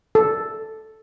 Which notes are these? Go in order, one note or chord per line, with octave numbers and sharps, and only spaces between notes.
A4